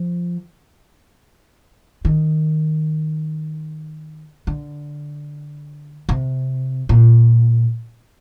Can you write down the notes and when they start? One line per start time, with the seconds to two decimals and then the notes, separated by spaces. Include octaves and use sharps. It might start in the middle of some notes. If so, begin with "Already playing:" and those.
Already playing: F3
2.05 D#3
4.47 D3
6.09 C3
6.89 A#2